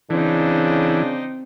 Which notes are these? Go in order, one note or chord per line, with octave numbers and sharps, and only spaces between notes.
C#3 E3 C4 D4 D#4